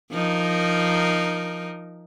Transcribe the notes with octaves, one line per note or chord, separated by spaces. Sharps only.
F3 D#4 A#4